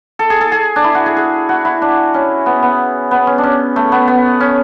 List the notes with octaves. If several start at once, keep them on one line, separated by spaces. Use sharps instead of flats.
A4
G#4
A4
G#4
D4
E4
F#4
G#4
G#4
F#4
E4
D4
C#4
B3
B3
B3
C#4
D4
C#4
A3
B3
B3
C#4